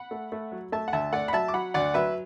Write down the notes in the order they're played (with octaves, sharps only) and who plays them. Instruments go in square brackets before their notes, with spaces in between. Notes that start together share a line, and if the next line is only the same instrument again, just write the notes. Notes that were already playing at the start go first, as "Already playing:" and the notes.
Already playing: [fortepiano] F#5 B5
A3
A3
F#3
A3 E5 A5
F#5
D2 E5 A5
A3 D5 F#5
B5
F#3 E5 A5
D6
F#3 F#5 B5
D2 D5 F#5
F#3 B4 E5